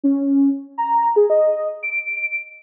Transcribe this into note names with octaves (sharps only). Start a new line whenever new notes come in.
C#4
A#5
G#4
D#5
D7